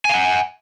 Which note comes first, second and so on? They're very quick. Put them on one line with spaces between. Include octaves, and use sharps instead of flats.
G#5 F5 F#5